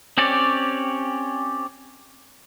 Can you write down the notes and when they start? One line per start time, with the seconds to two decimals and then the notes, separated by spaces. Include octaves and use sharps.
0.18 C4 C#4 G4 C#5 D5